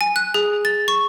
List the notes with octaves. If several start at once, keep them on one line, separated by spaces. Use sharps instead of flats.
G#5
F#6
G#4
A6
C#6